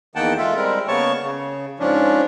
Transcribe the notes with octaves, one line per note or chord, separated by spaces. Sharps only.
E2 D#3 A#3 F#5 G5 A5
G#3 F4 A4 E5
G3 G#3 C4 A#4
C#3 A#3 B3 C#5 A5 C#6
C#3
G#2 F3 C#4 D4